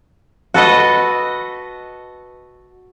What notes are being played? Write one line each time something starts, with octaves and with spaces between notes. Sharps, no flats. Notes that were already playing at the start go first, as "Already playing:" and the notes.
F#4 A4 B4 D#5